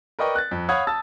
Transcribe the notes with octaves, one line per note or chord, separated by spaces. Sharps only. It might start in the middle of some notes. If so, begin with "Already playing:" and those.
A#4 B4 D5 D#5 G5 C#6
F#6 A6
F2
C#5 F5 F#5 B5 D#6 G#6
A5 E6 A6